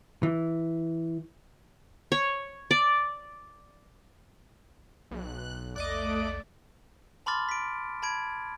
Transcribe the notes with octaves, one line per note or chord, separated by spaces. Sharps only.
E3
C#5
D5
B1 F#6
A#1 E2 A3 D5 D#5 D6 F#6
A5 B5 C6 D6 F6 A6
B6 D7
A5 B5 G#6 D7